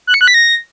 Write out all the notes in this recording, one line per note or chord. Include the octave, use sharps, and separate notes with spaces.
F#6
C#7
F#6
B6
A#6